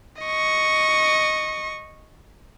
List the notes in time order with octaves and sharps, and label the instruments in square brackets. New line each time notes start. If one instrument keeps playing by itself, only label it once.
[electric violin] D#5 C#6